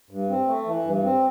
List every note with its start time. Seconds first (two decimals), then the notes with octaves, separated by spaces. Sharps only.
0.11 G2
0.30 C4
0.47 A3
0.67 E3
0.84 G2
1.04 C4